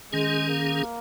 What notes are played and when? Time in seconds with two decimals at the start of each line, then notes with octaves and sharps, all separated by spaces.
0.12 D#3 G#3 C#4 G#4
0.49 A#3